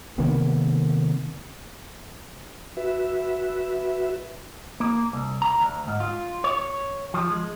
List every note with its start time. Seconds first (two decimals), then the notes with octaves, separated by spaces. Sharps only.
0.18 C3 D#3 A#3 B3
2.77 F#4 B4 E5
4.80 A#3
5.13 C2
5.42 A#5
5.60 D2
5.88 G#2
6.00 F4
6.44 C#5
7.14 F3
7.31 G#3